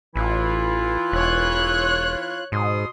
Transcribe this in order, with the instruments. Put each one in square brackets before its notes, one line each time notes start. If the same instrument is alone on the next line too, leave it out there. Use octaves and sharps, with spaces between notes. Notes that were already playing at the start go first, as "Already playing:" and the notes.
[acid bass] A1 [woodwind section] E3 E4 F4
[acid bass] E1 [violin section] C#5 F#6
[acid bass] G#2 [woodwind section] B2 C6 D#6